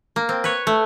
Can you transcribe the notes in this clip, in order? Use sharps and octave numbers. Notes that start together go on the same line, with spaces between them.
A#3
C4
B4 C#5
A3